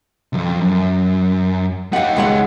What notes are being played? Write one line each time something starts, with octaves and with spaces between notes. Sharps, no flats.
C2 F2
F#2
D#4 G4 F5 F#5
C#2 G#3 F#5